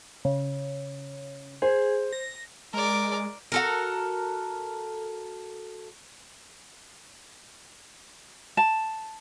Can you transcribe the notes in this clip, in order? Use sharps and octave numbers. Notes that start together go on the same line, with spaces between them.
C#3
G#4 C5
A#6
G#3 A#4 D5
F#4 A4 A#4
A5